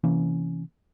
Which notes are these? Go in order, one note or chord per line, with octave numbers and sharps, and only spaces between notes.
C3 E3 A#3 C#4